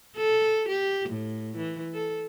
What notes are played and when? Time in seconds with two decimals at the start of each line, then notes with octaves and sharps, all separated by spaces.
0.17 A4
0.69 G4
1.09 A2
1.57 E3
1.94 A4